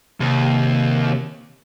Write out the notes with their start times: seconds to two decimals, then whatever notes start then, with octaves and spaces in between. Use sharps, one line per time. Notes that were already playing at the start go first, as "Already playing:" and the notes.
0.20 D#2 C3